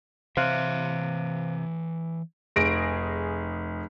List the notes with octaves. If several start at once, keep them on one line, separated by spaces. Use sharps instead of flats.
C3 E3 C5 C#5 E5 F5 F#6
F1 G#4 A#6 D7